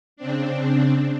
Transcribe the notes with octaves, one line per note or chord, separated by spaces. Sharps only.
C#3 C4 D4